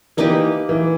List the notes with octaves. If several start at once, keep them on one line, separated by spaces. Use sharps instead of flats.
E3 A#3 D#4 G4 B4
E3